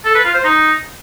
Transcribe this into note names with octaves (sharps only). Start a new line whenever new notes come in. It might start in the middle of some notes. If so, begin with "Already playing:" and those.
A4
B4
F4
C5
D#4